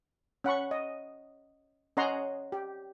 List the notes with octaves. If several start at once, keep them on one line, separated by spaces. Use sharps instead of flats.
C#4 F#5 B5 C#6
D#5
C#4 C#5 D#5 F#5 A#5 C6
G4